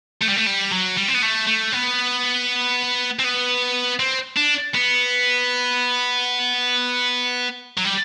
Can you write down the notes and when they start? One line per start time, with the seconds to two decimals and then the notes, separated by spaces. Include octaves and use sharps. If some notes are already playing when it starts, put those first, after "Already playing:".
0.21 A3
0.29 G3
0.36 A3
0.46 G3
0.71 F#3
0.97 G3
1.09 C4
1.15 B3
1.23 A3
1.47 A3
1.73 B3
3.19 C4
3.24 B3
4.00 C4
4.37 D4
4.75 B3
7.77 F#3
7.85 G3